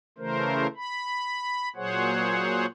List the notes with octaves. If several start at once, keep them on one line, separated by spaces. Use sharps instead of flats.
C#3 E3 A3 A#4 C5
B5
A#2 F#3 G#4 C5 C#5 F#5